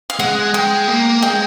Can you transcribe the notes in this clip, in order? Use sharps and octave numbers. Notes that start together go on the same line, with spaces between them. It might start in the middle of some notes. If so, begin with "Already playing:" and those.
F5
G#3 F#5
G#3 G5
A#3
G#3 G5